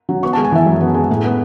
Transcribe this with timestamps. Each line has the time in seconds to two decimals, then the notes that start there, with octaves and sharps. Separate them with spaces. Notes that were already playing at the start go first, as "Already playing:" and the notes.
0.09 F#3
0.23 B3 C#6
0.33 A5
0.37 G#3
0.45 G#5
0.52 E3 E5
0.66 F#2
0.81 B3
0.94 G#3
1.09 A2
1.24 B3